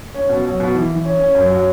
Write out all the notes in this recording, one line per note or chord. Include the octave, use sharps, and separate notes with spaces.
C#4
B2
F#3
B2
E3
E3
C#4
C#4
F#2
F#3